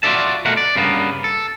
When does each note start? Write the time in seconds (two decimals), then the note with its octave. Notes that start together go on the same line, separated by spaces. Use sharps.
0.03 F4 F#4 G#4 D5 E5 A5
0.45 B2 A3 A#4 F#5
0.57 D5
0.76 G2 C#3 A#3 B3
1.24 A4